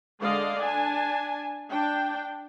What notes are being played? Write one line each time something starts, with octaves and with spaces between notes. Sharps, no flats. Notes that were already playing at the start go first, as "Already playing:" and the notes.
D3 G#3 D5 D#5 F5
D4 G#5 A5
D4 G5